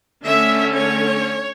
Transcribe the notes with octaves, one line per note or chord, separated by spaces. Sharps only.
D3 A3 C#4 E5
C#5